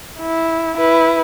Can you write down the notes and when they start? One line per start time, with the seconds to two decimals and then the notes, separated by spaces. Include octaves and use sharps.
0.20 E4
0.77 E4 B4